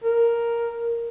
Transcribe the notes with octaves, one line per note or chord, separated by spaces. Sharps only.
A#4